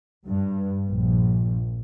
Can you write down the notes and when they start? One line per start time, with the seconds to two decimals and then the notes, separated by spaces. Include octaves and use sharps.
0.25 G2
0.87 A#1